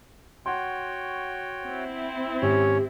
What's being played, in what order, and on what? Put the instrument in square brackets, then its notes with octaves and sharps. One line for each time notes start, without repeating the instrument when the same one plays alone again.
[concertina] F#4 C#5 G5 [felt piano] F#5 C6
[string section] C4 E4
[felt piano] G#1 [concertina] C#4 C#5 [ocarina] G4